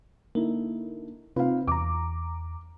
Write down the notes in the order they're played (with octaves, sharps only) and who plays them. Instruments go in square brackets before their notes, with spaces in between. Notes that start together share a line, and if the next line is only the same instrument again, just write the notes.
[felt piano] D3 D#4 E4 [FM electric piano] A#3
[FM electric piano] C3 F4 B4 [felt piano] C4 D#4 F5
[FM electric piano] E2 A#5 [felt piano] D6